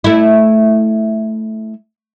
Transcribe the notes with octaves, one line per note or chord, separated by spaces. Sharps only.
A3 E4